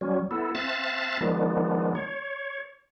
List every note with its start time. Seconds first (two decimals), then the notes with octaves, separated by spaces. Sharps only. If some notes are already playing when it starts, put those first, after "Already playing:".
0.01 F#3 G3 C#4
0.31 B3 E4 A4
0.55 C4 E5 F5 A5 F#6 A6
1.21 D#3 F3 G#3 B3 D4
1.95 C#5